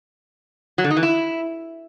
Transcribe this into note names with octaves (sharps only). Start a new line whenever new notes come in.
F#3
D3
D#4
E3
E4